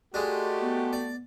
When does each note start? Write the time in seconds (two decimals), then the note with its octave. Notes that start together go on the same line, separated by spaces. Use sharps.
0.14 G#3 A3 D4 F#4 G4
0.60 B3
0.93 D5